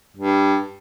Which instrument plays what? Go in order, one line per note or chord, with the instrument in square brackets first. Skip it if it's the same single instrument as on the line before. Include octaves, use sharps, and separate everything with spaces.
[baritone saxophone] G2